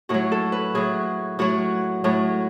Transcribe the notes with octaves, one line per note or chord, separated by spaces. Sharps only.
A2 F#3 F#4
A4
B4
A2 F#3 G#4
A2 F#3 F#4
A2 F#3